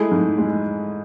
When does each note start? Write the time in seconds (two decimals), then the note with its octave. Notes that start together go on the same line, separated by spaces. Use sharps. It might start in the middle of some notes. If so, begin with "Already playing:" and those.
Already playing: G#3 A3 E4 G#4
0.11 G#2
0.38 G#3